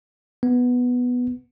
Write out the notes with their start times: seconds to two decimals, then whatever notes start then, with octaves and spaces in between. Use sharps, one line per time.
0.43 B3